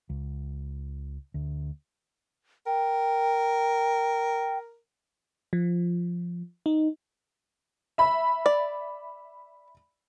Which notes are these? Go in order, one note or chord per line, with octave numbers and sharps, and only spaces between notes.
C#2
D2
A#4 G5
F3
D#4
E5 B5
D5